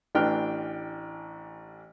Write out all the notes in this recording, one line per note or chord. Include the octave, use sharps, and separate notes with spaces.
A1 E3 D4 G5 F6 F#6